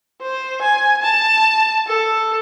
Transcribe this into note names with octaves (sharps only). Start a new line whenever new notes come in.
C5
G#5
A5
A4